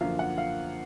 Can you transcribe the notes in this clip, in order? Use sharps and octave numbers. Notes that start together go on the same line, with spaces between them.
F#2 D3 F3 A#3 F5
F#5
F5